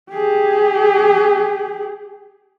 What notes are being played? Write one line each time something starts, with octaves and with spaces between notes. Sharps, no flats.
G4 G#4